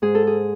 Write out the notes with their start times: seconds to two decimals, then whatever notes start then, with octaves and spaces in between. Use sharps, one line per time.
0.02 G#2 G#4
0.15 A4
0.27 G#4